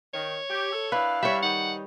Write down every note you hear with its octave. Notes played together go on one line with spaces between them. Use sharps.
D#3 C#5
G4
A4
D4 E4 B4 F5
G3 C#5 E5
D#3 D#4 F#5